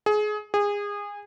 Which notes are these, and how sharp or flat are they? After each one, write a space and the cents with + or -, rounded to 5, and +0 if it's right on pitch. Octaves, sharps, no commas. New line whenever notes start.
G#4 +25
G#4 -25